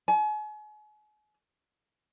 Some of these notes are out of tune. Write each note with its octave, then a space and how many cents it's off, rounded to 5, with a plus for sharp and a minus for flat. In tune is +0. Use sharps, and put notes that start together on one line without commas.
G#5 +40